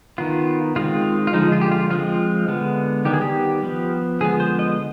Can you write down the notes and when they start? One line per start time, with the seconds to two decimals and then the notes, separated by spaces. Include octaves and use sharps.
0.18 D#3 B3 F4
0.76 D#3 G#3 C4 F4
1.27 F4
1.33 D3 F3 G#3 D#4
1.52 F4
1.61 G4
1.71 F4
1.90 F3 G#3 C4 F4
2.48 D3 G#3 B3
3.05 D#3 G3 B3 G4
3.13 G#4
3.22 G4
3.63 F3 B3
4.21 D3 F3 G#3 B3 G#4
4.40 C5
4.59 D#5